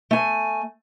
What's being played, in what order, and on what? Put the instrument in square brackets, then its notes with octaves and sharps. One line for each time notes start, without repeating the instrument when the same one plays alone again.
[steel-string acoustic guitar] A3 G#5